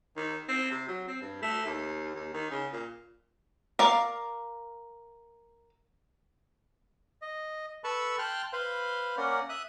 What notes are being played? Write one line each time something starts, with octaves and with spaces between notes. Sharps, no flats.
D#3
C4
C3
F#3
C4
G2
A3
D#2
D#2
D#3
C#3
A#2
A#4 D5 F5
D#5
A4 B4 A5 B5 C#6 E6
G5 A5 C6 F6 F#6
B4 C5 F5 B5 C6
A#3 C#4 A#4 D5 F#5
E5 D#6 F#6